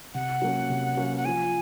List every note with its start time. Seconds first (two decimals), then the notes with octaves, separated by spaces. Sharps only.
0.14 C3 F#5
0.42 F#3 A#3 C#4
0.70 C3
0.97 F#3 A#3 C#4
1.17 F#5
1.25 F3 G#5